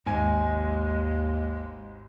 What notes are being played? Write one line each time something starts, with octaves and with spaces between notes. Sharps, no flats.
G#1 D#2 G#3 G#5